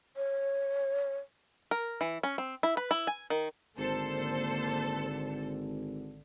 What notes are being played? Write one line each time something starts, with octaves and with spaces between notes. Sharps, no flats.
C#5
A#4
E3
C#4
C4
E4
B4
E4
G#5
D#3
G#1 D3 A#3 A4 C5